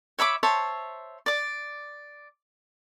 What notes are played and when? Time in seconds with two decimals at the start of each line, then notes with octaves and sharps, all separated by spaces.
0.19 C#5 E5 B5 D6
0.43 C5 C#5 E5 A5
1.26 D5 D6